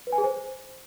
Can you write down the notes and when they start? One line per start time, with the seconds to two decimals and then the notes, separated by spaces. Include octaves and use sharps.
0.07 B4
0.12 G#5
0.18 G#4
0.24 C5